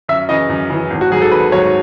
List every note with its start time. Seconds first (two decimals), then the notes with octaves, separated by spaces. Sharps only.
0.09 F#2 E5
0.29 C#3 E3 D#5
0.49 F#2
0.70 C#3 E3
0.90 G#1
1.01 F#4
1.11 G#2 F#3 G#4
1.22 A4
1.31 G#1 B4
1.52 G#2 F#3 C#5